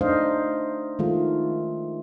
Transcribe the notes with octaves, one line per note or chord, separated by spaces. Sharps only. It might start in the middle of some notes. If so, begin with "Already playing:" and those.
A3 D4 D#4 C5 D#5 F5
D#3 G#3 A3 F4